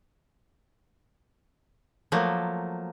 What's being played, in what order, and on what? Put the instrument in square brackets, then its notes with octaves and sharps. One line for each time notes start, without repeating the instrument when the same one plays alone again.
[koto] F3 F#3 A3 A#3